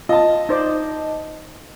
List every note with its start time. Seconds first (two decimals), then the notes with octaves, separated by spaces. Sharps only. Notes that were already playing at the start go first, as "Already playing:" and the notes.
0.09 F4 D#5 A5
0.49 D#4 C5 D5